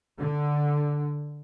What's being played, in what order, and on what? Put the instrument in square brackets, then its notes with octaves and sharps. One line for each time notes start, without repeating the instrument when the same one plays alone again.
[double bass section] D3